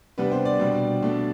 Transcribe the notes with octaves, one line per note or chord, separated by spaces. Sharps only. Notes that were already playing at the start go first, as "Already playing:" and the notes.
C3 G3 B3 D4 B4
C5
D5
B2 G3 D4
B2 A3 D4